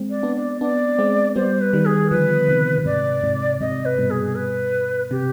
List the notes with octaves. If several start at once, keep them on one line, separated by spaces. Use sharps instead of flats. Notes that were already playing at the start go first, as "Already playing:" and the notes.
Already playing: G#3 C4
D5
B3 D4
D5
B3 D4 D5
G#3 C4
G3 B3 C5
B4
D#3 G3
G#4
D3 F3 B4
C3 D#3
B2
G#2 C3 D5
G#2 C3
G#2 C3 D#5
B4
G2 B2
G#4
B4
C3 G4